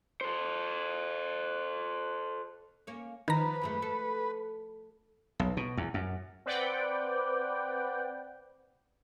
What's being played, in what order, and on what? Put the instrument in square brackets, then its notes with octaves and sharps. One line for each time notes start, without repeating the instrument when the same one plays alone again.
[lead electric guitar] A4 C5
[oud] A#3 C#4
[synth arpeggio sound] D#3 A#5 [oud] F3 [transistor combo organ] B4
[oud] F#2 G#3 A3
A4
[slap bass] B1
B2
E2
F#2
[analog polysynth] C4 B4 D5 F#5 G5